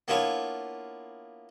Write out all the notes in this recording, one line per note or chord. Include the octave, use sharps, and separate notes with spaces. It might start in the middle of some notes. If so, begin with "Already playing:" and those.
A#3 B3 D4 E4 F4 C#5